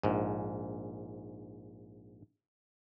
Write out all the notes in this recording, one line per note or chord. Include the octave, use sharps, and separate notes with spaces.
A#1 G#2